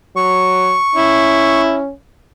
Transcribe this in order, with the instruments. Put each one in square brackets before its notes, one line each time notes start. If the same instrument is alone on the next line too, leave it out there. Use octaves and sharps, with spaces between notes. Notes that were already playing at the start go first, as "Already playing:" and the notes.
[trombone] F#3 [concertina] C#6
[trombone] C#4 [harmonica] E4